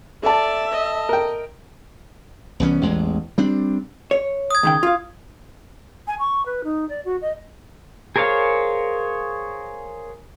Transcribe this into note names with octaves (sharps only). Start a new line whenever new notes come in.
A4 D5 E5 A5
D#5
A#4 G5
C2 E3 B3 C#4
A1 E2 G#3
G3 C4 D4
C#5
D#6 G#6
C#2 D#3 G5
F4 F5
G#5
C#6
B4
D#4
D5
F#4
D#5
G#4 A#4 C5 C#5 F5